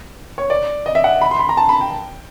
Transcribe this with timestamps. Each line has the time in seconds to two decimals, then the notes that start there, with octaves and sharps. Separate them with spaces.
0.38 C#5
0.50 D5
0.86 D#5
0.95 E5
1.04 F#5
1.21 B5
1.31 C6
1.39 B5
1.49 A#5
1.57 A5
1.69 B5
1.81 G5